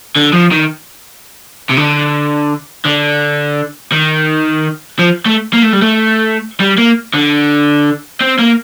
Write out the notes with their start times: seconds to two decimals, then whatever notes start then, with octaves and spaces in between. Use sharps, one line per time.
0.16 D3
0.33 F3
0.52 D#3
1.69 C3
1.77 D3
2.85 D3
3.92 D#3
4.99 F3
5.26 A3
5.53 A#3
5.63 A3
5.73 G3
5.82 A3
6.60 G3
6.78 A#3
7.14 D3
8.20 C4
8.39 A#3